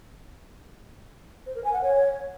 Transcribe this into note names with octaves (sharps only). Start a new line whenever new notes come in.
C5
A#4
G#5
F#5
C#5